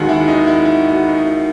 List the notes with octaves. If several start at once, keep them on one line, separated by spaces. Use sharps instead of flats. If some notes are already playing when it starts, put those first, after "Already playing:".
Already playing: D#2 D#3 G#3 F#4
E4
D#4
E4
E4
F#4
D#4
E4